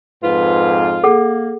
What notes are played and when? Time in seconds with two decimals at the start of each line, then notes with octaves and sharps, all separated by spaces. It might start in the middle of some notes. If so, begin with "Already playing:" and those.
0.23 F2 G#2 F4 B4
1.04 A#3 G#4 A4 F#5